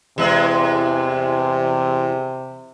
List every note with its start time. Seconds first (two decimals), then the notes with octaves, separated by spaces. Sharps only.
0.18 E2 C3 G#3